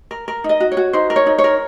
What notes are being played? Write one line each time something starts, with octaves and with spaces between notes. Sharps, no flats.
A#4
A#4
D#4
D#5
F#4
C#5
F#4
D#4 C5
A#4
C#5
D#4
C#5
A#4